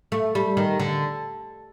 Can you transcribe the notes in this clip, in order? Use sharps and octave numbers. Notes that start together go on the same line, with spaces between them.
A3
G3
D#3
D3